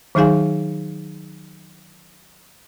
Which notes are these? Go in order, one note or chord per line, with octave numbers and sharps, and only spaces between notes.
D#3 F#3 D#4 G#4 F5 G#5